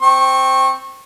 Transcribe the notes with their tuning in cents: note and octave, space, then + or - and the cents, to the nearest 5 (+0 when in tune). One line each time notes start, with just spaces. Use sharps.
C4 +0 C#6 -25